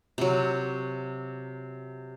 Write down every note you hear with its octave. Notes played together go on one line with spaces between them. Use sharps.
C3 F#3